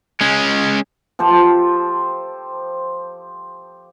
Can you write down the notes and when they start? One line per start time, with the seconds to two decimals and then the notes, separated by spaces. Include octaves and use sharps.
0.21 G#3 C#4
1.19 F3 G4 A4 C5